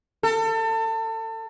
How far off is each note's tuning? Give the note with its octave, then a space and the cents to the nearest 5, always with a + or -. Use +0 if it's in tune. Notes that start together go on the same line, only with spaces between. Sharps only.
A4 +30